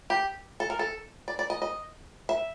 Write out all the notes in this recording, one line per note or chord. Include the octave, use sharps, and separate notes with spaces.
G4
A4
A#4
A4
D5
D5
D#5
D#5
E5